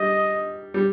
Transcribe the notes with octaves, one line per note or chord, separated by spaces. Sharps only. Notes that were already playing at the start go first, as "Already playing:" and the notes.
Already playing: G3 D#5
G3